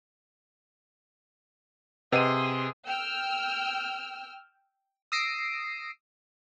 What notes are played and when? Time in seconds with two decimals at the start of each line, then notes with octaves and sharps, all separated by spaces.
2.12 C3 G#4 B4 D#5 F#5 C6 D#7
2.86 G5 E6 F6
5.12 D#6 E6 A#6 C7 D7